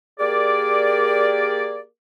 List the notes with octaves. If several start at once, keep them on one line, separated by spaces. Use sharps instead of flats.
A#3 G4 G#4 A#4 D5